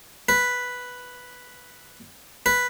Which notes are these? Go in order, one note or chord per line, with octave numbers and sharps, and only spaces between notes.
B4
B4